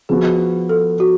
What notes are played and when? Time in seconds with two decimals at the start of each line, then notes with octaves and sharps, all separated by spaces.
0.09 F3 B3 F#4 G#4
0.69 A4
1.00 F#4